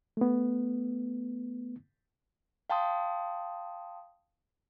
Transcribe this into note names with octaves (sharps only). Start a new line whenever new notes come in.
A3 B3
F5 G5 A5 C6 D#6